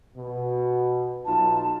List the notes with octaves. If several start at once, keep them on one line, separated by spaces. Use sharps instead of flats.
B2
B1 D#4 F4 A5